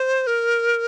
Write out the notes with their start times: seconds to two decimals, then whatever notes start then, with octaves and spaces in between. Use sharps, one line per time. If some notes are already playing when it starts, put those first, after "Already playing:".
Already playing: C5
0.27 A#4